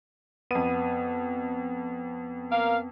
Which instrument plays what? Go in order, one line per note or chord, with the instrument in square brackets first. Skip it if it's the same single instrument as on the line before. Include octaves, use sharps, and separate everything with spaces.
[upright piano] F2 D#7 [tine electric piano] B3
[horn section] A#3 A#4 F5